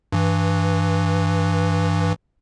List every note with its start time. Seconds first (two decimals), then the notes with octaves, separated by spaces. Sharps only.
0.12 G2 E3